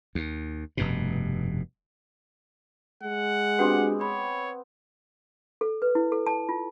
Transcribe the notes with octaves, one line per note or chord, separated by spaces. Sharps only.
D#2
F1 G2 B2
G#3 F#5
B3 C4 D4 F#4 G4 D5
C#5 B5
A4
B4
E4
A4
A5
F4